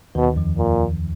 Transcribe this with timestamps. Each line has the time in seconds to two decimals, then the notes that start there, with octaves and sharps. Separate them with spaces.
0.15 D#2 B2 D#3
0.36 F2 F3
0.58 A#2